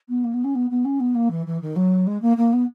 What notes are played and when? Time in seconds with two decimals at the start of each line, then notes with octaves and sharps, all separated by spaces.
0.09 B3
0.24 A#3
0.33 B3
0.44 C#4
0.55 B3
0.70 B3
0.85 C#4
1.00 B3
1.15 A#3
1.30 E3
1.46 E3
1.61 D#3
1.76 F#3
2.06 G#3
2.21 A#3
2.37 A#3
2.53 B3